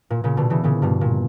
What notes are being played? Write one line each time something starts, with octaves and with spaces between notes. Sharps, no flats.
A#2
A#2 C#3
B2 D3
C#3 E3
A#2 C#3
G2 B2
A#2